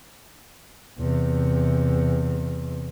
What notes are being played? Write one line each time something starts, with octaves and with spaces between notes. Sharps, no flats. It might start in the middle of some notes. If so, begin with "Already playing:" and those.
E2 C3